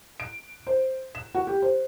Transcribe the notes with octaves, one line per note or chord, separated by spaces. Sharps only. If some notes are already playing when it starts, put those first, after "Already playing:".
D7
C5
E7
F#4
G4
C5